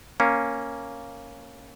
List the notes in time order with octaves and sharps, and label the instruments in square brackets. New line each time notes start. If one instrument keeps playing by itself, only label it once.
[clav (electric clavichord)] A#3 C#4